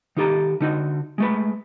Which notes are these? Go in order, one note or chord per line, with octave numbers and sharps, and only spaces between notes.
D#3 D#4 G4 A4 A#5
D3 D#4 F#4
G#3 A3 B4